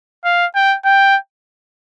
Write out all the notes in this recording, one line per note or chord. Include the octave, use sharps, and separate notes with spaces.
F5
G5
G5